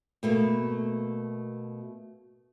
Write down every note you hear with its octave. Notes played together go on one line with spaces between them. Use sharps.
B2 A3 A#3